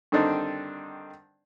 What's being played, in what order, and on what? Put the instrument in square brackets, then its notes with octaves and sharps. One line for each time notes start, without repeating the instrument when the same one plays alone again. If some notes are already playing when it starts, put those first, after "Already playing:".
[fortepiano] G2 D3 D#3 C4 D4 D#4